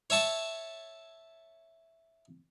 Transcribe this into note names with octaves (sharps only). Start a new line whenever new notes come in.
C#5 E5 A5 C#6